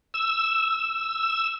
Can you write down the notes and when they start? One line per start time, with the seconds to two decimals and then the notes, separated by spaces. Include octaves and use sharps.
0.14 E6